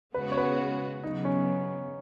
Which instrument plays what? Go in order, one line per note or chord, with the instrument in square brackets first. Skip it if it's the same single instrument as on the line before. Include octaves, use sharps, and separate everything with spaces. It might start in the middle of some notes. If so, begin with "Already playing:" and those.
[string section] C#3 G#3 B3 F#4 [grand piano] B4
[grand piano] C#5
B4
[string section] C#3 F#3 B3 [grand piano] D#4
[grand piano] C#4